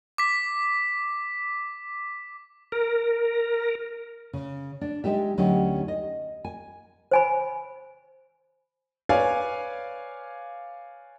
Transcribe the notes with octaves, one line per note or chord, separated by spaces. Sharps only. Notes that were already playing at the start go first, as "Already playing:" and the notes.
D6 B6
A#4
C#3
D4
G#3 D#4 G4 E5
D2 F#3 C#4 D#4 G4
D#5
G#5
C5 G#5 B5
B4 C#5 D5 F5 G#5